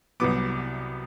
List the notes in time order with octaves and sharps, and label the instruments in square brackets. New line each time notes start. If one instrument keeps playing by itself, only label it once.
[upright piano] C2 C3 F#3 B3 D6